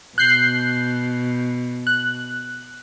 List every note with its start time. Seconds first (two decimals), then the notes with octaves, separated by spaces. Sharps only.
0.18 B2 F#6 G6 C7
1.87 F#6